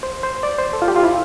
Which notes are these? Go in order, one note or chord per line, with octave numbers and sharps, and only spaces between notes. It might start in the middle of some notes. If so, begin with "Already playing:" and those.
C5
C5
D5
C5
A4
F4
G4
F4
E4